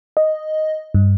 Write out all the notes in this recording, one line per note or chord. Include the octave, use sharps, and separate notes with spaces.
D#5
G2